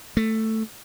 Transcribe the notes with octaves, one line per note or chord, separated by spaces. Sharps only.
A3